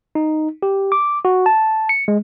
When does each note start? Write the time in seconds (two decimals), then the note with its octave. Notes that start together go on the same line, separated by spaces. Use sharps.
0.15 D#4
0.63 G4
0.92 D6
1.25 F#4
1.46 A5
1.89 C#7
2.08 G#3